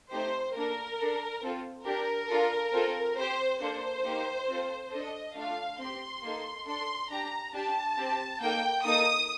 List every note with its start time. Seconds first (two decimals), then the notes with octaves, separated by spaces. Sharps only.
0.11 A3 C4 D#4 G4 C5
0.55 A#3 D4 A4 A#4
0.99 D4 A4
1.42 C4 F4 A4
1.86 D4 G4 A#4
2.30 D4 F4 A4
2.74 C4 F4 A4
3.17 C4 G4 C5
3.61 A#3 D4 A4 C5
4.04 A#3 D#4 G4
4.48 C4 F4 A4
4.92 D4 A4 D#5
5.36 A3 D4 F4 F5
5.80 C4 G4 C6
6.23 A#3 D#4 A4
6.66 D4 A4 C6
7.10 D4 G4 A#5
7.54 D4 G4 A5
7.98 C4 G4
8.41 A#3 D#4 A4 G5
8.85 A#3 D#4 A4 D#6